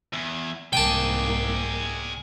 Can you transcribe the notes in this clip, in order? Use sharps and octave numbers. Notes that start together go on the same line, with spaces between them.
E2
C2 G#2 A#3 G#4 D5 G5 A5